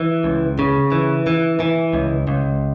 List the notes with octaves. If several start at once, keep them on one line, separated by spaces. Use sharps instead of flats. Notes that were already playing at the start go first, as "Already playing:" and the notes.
Already playing: E3
C#2
C#3
E3
E3
E3
C#2
C#2